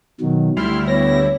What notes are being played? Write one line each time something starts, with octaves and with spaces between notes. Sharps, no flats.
B2 D#3 F#3
D2 G3 E4 C6 F6
B3 C#5 A#6